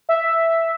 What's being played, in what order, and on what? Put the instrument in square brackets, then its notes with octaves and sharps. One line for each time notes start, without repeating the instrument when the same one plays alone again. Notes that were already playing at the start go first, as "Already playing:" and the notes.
[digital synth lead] E5